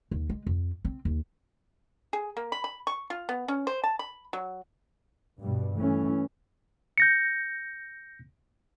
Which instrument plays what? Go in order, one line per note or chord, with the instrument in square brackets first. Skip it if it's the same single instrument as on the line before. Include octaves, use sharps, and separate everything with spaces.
[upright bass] D#2
G#3
F2
C4
D#2
[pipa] G#4
A#3
B5
B5
C#6
F4
B3
C#4
C5
A5
B5
F#3
[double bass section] G2 B2 G3
E3 A3 C#4
[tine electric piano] G6 A#6 C#7